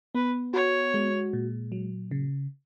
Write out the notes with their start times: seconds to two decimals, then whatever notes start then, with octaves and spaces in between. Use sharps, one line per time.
0.15 B3 B4
0.54 F#4 C#5
0.94 G#3
1.33 A#2
1.72 F#3
2.11 C#3